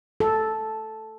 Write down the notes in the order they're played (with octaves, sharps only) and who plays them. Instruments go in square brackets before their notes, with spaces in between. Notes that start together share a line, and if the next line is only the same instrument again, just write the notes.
[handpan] A4